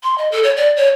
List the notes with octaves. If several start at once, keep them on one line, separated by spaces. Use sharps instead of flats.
C6
D#5
A4
C#5
D5
C#5